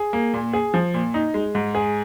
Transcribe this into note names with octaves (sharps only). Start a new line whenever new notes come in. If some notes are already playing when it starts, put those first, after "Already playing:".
Already playing: G#4
A#3
A#2
G#4
F3
A#2
D#4
G#3
G#2
G#4